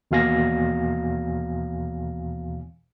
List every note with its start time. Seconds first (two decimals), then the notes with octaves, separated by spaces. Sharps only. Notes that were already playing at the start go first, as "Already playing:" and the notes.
0.11 D#2 B2 E3 F5 G#5 A#6